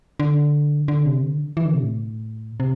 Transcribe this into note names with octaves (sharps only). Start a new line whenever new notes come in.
D3
D3
C3
D3
E3
D3
C3
A2
C3